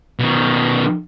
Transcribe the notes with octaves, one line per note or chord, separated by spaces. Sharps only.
B2 D#3